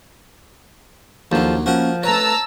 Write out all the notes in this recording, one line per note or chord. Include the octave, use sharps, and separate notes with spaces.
D#2 F3 F#3 D4 F4 A4
F3 A#3 C#4 F#4 A#4
A3 B4 C#5 A5 A#5 E6